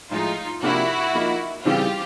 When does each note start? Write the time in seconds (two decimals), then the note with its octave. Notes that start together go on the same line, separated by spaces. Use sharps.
0.11 A2 F3 G#3 D#4 F4
0.62 C3 F3 A#3 D4 E4 F#4 G4
1.14 F3 A#3 D#4
1.65 C#3 E3 G3 C4 F4 G4